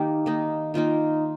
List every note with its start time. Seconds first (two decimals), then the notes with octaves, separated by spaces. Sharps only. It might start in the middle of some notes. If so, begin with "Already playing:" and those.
Already playing: D#3 A#3 D#4 G4 A#4
0.26 D#3 A#3 D#4
0.74 D#3 A#3 D#4 F4